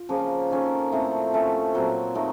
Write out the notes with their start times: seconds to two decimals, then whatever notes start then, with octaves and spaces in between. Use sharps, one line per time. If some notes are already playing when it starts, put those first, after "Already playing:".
Already playing: F4
0.09 C#3 F3 A#3 C#4
0.51 D#3 A#3 C#4 A4
0.91 A2 F3 A3 C4
1.33 F3 A3 C#4 A4
1.74 A#2 F#3 C4 F4
2.15 D#3 A3 D#4